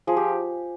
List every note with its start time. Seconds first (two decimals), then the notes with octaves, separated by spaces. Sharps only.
0.07 F3 G#4
0.17 G4